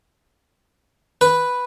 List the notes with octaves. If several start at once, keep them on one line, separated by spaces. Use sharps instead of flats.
B4